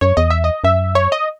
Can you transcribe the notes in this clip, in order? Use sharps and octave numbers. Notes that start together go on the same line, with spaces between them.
F#2 C#5
E2 D#5
E5
D#5
F#2 E5
C#5
D#5